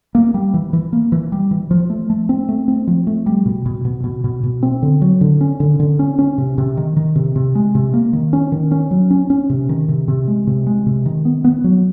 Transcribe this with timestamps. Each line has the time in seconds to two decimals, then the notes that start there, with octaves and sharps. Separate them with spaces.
0.15 A#3
0.34 G3
0.54 E3
0.73 E3
0.93 A#3
1.12 E3
1.32 G3
1.51 E3
1.71 F3
1.90 A3
2.10 A3
2.29 C4
2.49 A3
2.68 C4
2.87 F3
3.07 A3
3.26 G3
3.46 B2
3.66 B2
3.85 B2
4.04 B2
4.24 B2
4.43 B2
4.63 C4
4.82 D3
5.02 F#3
5.21 D3
5.41 C#4
5.60 D3
5.80 D3
5.99 C#4
6.19 C#4
6.38 C3
6.58 C3
6.77 D#3
6.97 D#3
7.15 C3
7.36 C3
7.55 G#3
7.75 C3
7.94 A#3
8.13 D#3
8.33 C#4
8.52 D#3
8.71 C#4
8.91 F#3
9.11 C#4
9.30 C#4
9.50 C3
9.69 D#3
9.89 C3
10.08 C3
10.28 G#3
10.47 C3
10.66 G#3
10.86 C3
11.06 D#3
11.25 B3
11.44 B3
11.64 F#3